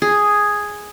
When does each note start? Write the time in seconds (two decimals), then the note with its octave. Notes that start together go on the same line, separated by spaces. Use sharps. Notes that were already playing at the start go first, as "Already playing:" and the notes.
0.02 G#4